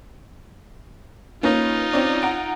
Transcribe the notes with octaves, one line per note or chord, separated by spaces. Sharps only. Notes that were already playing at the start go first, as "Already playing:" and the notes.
A#3 C#4 D#4 F4 B4
C4 C#4 D5
F#5 A#5 D7